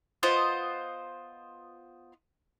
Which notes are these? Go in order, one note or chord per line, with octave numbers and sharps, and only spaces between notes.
B3 F4 C5 D#5